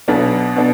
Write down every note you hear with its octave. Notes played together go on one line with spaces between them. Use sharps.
B1 B2 B3 D4
B2 B3 D4